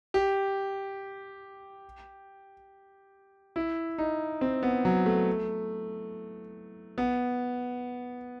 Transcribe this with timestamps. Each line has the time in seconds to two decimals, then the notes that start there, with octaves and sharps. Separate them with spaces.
0.14 G4
3.56 E4
3.98 D#4
4.41 C4
4.63 B3
4.85 F#3
5.06 A3
6.98 B3